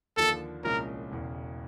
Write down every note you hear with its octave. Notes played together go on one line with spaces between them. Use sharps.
D#2 D3 F3 A#3 A4
C2 A#2 F3 G#3 C#4 A#4
E1 E2 C#3